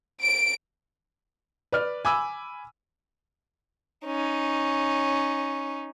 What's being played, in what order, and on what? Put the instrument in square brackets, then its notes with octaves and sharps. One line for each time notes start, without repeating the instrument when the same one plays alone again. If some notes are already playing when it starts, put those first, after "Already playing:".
[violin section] D7
[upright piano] B4 D5 F6
G#5 B5 D6 E6
[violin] C#4 D#4